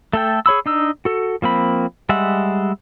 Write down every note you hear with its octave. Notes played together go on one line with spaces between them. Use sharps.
A3 A4 G5
G#4 C#5 B5 E6
D4 D#4 E6
F#4 A4
F3 A#3 C4 B5
G3 G#3 E5 F#5